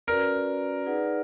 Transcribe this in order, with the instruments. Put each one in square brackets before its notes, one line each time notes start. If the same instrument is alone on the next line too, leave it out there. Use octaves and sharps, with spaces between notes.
[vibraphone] C#4 F#4 B4 D5 [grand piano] A#4
[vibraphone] D#4 G#4 B4 D5 F#5